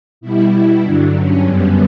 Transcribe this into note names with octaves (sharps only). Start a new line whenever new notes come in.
B2 G3 E4
G2 D3 F#3 D4
C#4
F#2 D3 G3 B3